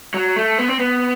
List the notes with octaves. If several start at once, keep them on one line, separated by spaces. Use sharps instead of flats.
F#3
A3
B3
C4
B3